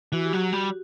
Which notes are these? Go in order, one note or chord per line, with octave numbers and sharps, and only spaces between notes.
E3 F#4
G4
F#3 F#4
G3